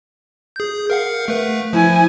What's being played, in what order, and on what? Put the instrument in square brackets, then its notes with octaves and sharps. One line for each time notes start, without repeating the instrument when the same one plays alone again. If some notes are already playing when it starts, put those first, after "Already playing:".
[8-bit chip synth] G#4 G6
A#4 F5 F#5
A3 B4
[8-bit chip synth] F3 [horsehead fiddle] E4 G#5